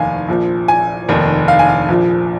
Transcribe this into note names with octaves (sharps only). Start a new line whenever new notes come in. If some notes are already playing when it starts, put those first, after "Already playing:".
Already playing: F1 D#2 D#3 F5 G#5
A#1 A#2 F3
G#5
F1 D#2 D#3
F5
G#5
F5
A#1 A#2 F3